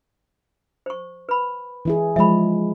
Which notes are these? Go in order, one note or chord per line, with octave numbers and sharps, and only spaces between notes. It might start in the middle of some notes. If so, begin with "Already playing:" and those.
C5 C#6
B4 B5
E3 E4 G#4
F3 G#3 E5 B5